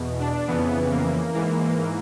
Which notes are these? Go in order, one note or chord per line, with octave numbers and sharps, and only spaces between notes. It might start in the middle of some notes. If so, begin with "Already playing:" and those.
Already playing: E2 B2
D4
F2 C#3 E3 B3
A#3
G#2 E3 A#3
A#3